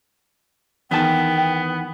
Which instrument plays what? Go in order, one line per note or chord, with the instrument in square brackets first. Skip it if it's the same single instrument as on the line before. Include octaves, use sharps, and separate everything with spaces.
[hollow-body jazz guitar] E2 D#3 A5 [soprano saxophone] B3 [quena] G5